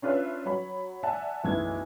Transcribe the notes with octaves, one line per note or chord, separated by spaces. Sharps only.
C#4 D4 F4 B4 C#5 E5
F#3 C#5 B5
D5 E5 F#5 G#5 A5
F#1 B1 E3 A3 G#6